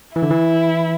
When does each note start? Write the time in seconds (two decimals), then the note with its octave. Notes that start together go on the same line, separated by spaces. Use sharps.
0.16 E3 E4
0.22 D3
0.30 E3